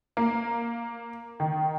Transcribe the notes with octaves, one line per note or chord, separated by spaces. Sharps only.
A#3
D#3